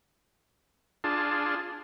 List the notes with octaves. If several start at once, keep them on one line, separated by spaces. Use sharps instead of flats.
D4 F4 G#4 A5